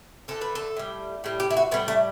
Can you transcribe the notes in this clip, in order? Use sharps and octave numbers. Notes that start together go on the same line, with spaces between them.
D3 A3 A4
B4
A4
A2 G3
A2 G3
G4
E4
F#4
A2 G3 B3
A3